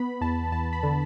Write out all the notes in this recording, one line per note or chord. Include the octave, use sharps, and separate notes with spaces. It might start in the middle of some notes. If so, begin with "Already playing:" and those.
Already playing: B3 B5
E2 A5
E2 A5
B5
D3